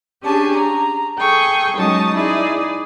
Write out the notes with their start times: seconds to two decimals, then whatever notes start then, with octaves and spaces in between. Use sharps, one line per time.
0.23 C#4 D4 G4 G#4 A5
0.56 A#5
1.19 G#4 A4 G5 C#6
1.76 F#3 G#3 C#4 D#4 A5 D#6
2.15 D#4 E4 G#4 D5 E5